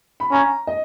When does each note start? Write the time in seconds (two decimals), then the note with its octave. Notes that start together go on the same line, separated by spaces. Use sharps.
0.20 B5
0.32 C#4 A#5
0.67 D#5